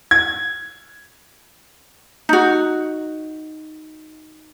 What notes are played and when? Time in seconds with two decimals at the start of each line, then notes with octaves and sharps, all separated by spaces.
0.11 G#6
2.29 D#4 F#4